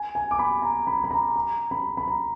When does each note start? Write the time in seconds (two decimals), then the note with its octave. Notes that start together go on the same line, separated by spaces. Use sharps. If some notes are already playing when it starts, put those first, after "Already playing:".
Already playing: G#5
0.15 G#5
0.31 D6
0.39 B5
0.62 A#5
0.87 B5
1.04 B5
1.11 A#5
1.36 A#5
1.71 B5
1.97 B5
2.08 A#5